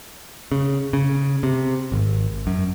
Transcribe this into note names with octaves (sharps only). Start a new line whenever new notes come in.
C#3
C#3
C3
G#1
F#2